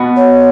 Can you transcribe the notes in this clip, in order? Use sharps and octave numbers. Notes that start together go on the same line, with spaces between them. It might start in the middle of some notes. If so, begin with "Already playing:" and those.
Already playing: B2 B3 F#4
C#5